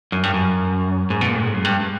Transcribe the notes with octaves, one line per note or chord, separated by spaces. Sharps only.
F#2
G2
F#2
G#2
B2
A#2
A2
G#2
F#2
G2